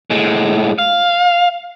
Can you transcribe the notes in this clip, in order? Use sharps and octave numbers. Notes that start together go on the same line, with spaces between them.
A2 G#3
F5